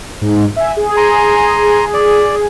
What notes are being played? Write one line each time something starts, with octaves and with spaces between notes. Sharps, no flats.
G#2
E5 G#5
G#4
G#5 A#5 C6
D5